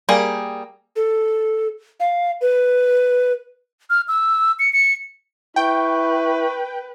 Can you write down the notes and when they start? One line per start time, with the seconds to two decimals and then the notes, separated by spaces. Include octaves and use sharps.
0.09 G3 A#3 G#4
0.96 A4
2.00 F5
2.41 B4
3.90 F6
4.08 E6
4.59 C#7
4.73 C#7
5.56 E4 B4 G5 C#6